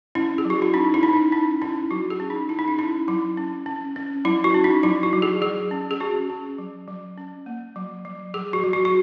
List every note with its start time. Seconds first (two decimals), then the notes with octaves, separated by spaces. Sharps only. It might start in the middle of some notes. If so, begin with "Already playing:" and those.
0.15 C#4 E4
0.38 G#4
0.45 F#3
0.50 F#4
0.62 E4
0.74 C#4 D#4
0.94 E4
1.03 C#4 D#4
1.13 E4
1.32 C#4 D#4
1.62 C#4 E4
1.91 F#3 F#4
2.10 G#4
2.20 C#4
2.30 D#4
2.49 C#4 E4
2.59 D#4
2.68 E4
2.79 C#4 E4
3.08 F#3 E4
3.37 C#4
3.66 C#4
3.96 C#4
4.25 F#3 E4
4.44 F#4
4.54 C#4
4.64 D#4
4.83 F#3 E4
5.03 F#4
5.13 F#3
5.22 G#4
5.42 F#3 G#4
5.71 C#4
5.91 G#4
6.00 C#4 F#4
6.30 C#4
6.58 F#3
6.88 F#3
7.18 C#4
7.46 A#3
7.76 F#3
8.05 F#3
8.34 F#3 G#4
8.53 F#4
8.64 F#3
8.73 F#4
8.85 F#4